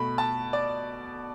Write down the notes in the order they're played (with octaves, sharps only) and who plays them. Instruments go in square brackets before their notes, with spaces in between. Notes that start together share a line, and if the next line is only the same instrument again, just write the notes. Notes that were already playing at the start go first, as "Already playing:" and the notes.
Already playing: [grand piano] B2 A3 B5
A5
D5